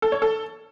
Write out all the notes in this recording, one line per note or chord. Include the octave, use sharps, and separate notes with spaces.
A4
C#5
A4